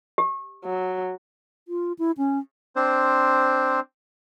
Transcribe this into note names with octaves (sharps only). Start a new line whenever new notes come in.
G4
F#3
F4
E4
C#4
C4 D4 C5